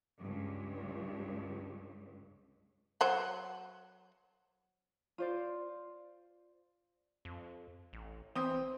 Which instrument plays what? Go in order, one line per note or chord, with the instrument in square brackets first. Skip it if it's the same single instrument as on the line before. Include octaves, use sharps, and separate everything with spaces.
[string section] C#2 G2
[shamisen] F#3 C5 F#5
[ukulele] F4 C5 D5
[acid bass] F2
A1
[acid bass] E3 [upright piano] C4 D#6